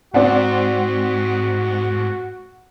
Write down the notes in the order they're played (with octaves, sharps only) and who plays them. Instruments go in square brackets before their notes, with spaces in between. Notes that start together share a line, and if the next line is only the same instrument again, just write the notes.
[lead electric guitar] G#2 [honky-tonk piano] C4 D5 F#5 [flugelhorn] F#4